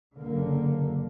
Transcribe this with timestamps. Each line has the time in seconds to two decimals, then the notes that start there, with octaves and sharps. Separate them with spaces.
0.19 F#1 D3 A#3